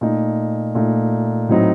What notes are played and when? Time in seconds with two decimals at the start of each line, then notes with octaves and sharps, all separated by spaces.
0.01 A#2 A3 D#4
0.75 A#2 A3 D#4
1.49 A2 F#3 C4 D#4